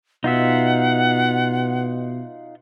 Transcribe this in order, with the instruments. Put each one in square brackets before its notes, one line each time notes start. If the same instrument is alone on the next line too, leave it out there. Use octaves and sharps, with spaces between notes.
[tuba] B2 [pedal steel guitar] D#4 F4 E5 [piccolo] F#5